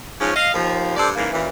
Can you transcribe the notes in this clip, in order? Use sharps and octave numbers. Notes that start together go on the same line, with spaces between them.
G#2 F3 C#4
D#5 F5
D#2 F3
G2 A4 C5 D5
G#2 C#3 E3 A#3
F#2 A#2 E3